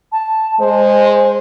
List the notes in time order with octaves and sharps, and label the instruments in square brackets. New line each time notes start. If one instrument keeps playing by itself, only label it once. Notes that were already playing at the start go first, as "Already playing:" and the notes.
[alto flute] A5
[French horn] G#3 [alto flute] C5